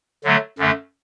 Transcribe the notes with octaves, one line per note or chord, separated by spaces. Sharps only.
D3 F#3 A3
F#2 D3 A3